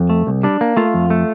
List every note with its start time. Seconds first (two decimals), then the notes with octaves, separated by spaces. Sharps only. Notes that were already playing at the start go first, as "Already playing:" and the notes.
Already playing: F2
0.10 A3
0.27 C2
0.43 G3 D4
0.61 A#3
0.77 A3 F4
0.94 F2
1.10 A3